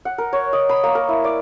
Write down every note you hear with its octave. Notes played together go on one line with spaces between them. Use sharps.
F#5
A#4
C#5
D#5
B5
A#3
A#4
E4
D5